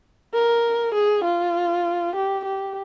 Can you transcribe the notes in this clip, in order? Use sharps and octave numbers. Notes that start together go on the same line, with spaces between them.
A#4
G#4
F4
G4
G4